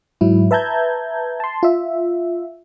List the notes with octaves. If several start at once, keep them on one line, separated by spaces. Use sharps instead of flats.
G#2 F#3 E4
B4 E5 A5 A#5 G6 G#6
A5 C6
F4 E5